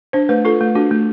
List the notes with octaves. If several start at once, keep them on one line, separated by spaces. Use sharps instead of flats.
D4 C5
A3 B4
F4 A4
A3
D4 F#4
A3